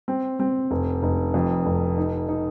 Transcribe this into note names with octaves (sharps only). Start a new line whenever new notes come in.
C4
C4
F1
F1
F2
F1
D#4
D#4